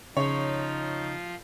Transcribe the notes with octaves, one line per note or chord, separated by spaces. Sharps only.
C#3 F3 D#4 F4 C#5